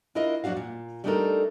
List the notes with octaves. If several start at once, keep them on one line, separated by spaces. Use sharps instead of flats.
D4 E4 F4 A#4 D#5
F2 F#3 D4 F#4 F5
A#2
G3 A3 D4 D#4 A4 A#4